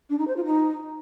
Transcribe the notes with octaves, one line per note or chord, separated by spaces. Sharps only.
D4
D#4
C5
F4
D#4